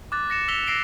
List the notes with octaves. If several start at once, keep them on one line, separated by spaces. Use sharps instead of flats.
D6 F#6 A6
A#6 C#7 E7
E6 B6 F7 G7
E6 A#6 C7 D7 G7